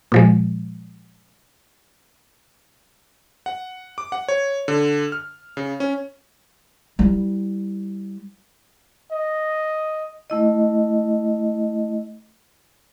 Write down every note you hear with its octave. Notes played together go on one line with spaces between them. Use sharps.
A#2 F3 G#3
F#5
D6
F#5
C#5
D3
F6
C#3
C#4
G3 E4
D#5
A3 E4 D#5